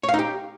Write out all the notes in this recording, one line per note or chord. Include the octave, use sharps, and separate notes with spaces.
C#5
F5
D#4
G4